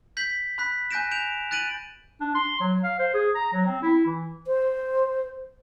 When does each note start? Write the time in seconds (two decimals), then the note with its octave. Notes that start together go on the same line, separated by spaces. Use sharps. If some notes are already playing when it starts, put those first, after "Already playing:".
0.17 G6 B6 F#7
0.58 B5 F#6 B6
0.91 G#5 F#6 G6 A#6 D7 E7
1.11 G6 D7 E7 F7
1.51 F#6 A6 D7 D#7 F#7
2.21 D4
2.35 C6
2.60 F#3
2.83 F5
2.99 C5
3.14 G#4
3.35 A#5
3.53 F#3
3.66 C4
3.82 E4
4.06 E3
4.47 C5